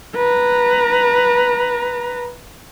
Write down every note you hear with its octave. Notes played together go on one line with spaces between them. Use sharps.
B4 A#5